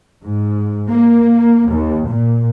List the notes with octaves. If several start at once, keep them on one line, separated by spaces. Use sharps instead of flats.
G#2
A#3
D#2
A#2